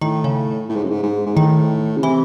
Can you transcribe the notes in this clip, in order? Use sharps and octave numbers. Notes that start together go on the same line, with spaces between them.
A2 D#3
C#3
A2
G#2
F#2
G#2
G#2
G#2
A2 D#3
C#3
C3 E3